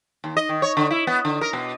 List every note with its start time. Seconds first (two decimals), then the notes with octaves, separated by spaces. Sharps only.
0.24 D#2
0.37 D#5
0.49 D#3
0.62 C#5
0.77 D3
0.91 E4
1.07 B3
1.25 D3
1.41 A#4
1.53 B2